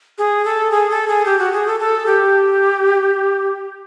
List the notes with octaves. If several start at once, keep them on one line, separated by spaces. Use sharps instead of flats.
G#4
A4
G#4
A4
G#4
G4
F#4
G#4
A4
A4
G4